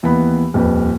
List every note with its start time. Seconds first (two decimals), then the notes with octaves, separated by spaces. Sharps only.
0.03 D#2 E3 B3 B5
0.54 D#1 F2 B4